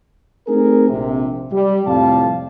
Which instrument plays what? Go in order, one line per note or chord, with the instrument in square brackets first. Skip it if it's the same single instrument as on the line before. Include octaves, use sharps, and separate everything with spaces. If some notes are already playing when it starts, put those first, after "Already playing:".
[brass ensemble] A3 C4 D#4 G#4 A#4
A#1 C3
G3
F2 A2 C3 G3 F5 A5